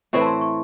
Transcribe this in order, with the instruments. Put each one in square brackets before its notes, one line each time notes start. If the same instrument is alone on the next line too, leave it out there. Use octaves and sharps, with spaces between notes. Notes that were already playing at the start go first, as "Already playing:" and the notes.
[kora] A2 E3 C4 E4 [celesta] C#6
[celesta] A5
C6
C#6